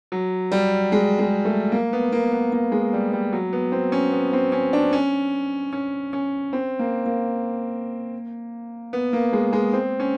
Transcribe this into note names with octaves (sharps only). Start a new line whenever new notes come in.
F#3
G3
G#3
G#3
A3
A#3
B3
A#3
B3
A#3
G#3
G3
G3
F#3
B3
C4
C#4
B3
C4
C#4
D4
C#4
C#4
C#4
C4
A#3
A#3
B3
A#3
G#3
G#3
C4
C#4